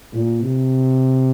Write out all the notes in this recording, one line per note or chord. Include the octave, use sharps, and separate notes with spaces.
A#2
C3